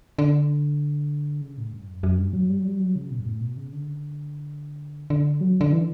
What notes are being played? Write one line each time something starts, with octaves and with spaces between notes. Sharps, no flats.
D3
C#3
A2
G2
F#2
F#2
G2
F#3
G3
F#3
G3
F#3
C#3
B2
G2
A2
B2
C#3
D3
D3
F#3
D3
E3